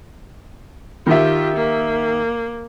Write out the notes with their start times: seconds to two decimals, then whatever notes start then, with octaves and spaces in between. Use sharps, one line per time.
1.06 D#3 F4 G4 E5
1.56 A#3